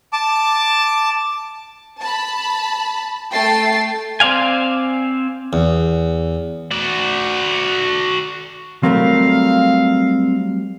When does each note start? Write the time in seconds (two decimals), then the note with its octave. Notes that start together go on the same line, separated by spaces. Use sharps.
0.13 A5 D6
2.00 A5 B5
3.33 A3 G5 A5 A6 C7
4.20 C4 C5 D5 F5 G#5
5.53 E2
6.71 F#4 D5
8.83 F#3 G3 A3 C4 A#4 F5